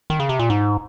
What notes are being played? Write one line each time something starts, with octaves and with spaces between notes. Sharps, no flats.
D#3
C#3
C3
A#2
G#2